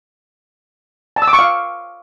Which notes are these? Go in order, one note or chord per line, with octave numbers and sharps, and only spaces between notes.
A5
E6
D6
C#6
F5